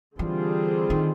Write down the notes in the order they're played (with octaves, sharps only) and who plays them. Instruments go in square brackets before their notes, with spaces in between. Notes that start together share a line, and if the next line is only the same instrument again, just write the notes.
[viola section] D3 G3 C4 F4 G#4 [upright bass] E3
[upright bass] D#3